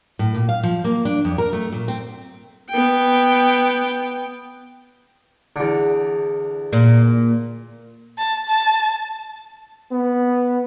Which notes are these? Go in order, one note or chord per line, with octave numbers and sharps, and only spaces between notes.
A2
A#2
F5
F3
A#3
D4
F2
A#4
A3
A#2
C4
B3 G5
E2 D3
A#2
A5
A5
B3